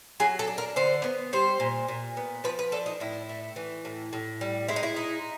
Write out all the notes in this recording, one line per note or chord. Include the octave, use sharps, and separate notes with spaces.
F#3 G#4
A4
D4
A#4
D3 C5
B3
G3 C5
A#2
A#2
B3
F3 B4
B4
D4 A4
D#4
A2 E4
A3
E3
A2
A2
G3
G#3 E4
D#4
E4
D#4